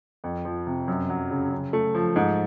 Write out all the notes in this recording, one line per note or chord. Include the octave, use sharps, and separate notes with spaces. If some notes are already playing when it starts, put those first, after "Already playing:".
F2
F3
C3
F#2
F#3
C#3
C#3
A3
F3
G#2